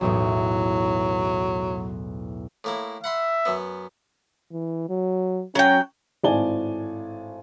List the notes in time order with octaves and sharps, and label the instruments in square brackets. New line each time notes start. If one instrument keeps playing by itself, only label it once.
[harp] B1 E2 A2 [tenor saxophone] F#3
[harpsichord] A2 A#3 E4
[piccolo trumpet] E5 [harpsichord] F#5 B5 C6
[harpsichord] F#2 B3
[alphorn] E3
F#3
[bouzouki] F#3 G5 [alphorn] C#4
[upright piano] G#1 A2 D5 G#5 A5 G7